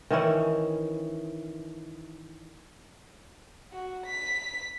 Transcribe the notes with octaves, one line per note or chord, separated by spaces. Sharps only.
D#3 E3 C#4 E4
F#4
B6